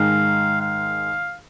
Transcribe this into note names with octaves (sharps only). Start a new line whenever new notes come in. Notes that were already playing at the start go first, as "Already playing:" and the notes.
Already playing: G#2 D#3 G#3 D#4 F5
F5